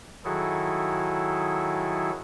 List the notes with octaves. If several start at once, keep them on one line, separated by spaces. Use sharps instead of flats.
D#3 F#3 E4 F#4 G#4 A4